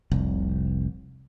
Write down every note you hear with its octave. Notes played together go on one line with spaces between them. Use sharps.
F1 C2